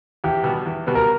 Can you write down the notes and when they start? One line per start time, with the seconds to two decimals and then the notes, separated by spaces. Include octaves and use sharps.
0.24 E2 G4
0.44 B2 G3 B3
0.65 E2
0.86 B2 G3 B3
0.95 A#4